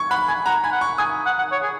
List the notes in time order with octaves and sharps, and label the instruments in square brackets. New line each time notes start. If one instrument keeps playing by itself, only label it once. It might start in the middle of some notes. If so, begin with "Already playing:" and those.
Already playing: [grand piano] C#6 G#6
[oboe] F#5 [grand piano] B5
[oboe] G#5 [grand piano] B5
[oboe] F#5 [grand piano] A#5
[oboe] G#5 [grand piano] B5
[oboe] F#5
[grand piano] C#6
[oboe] G#5 [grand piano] D#6
[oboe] F#5
F#5
C#5
G#4